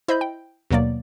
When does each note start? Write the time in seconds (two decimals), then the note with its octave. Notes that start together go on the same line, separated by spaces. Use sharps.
0.08 E4 C5 D#5 B5 G6
0.21 G5
0.71 D#2 B2 F#3 A#3 D5